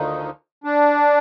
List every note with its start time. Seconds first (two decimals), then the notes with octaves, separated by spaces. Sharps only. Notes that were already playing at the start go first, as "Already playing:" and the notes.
Already playing: D2 D3 D#3 F3 D#4
0.64 D4